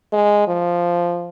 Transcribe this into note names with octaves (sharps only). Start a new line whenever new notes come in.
G#3
F3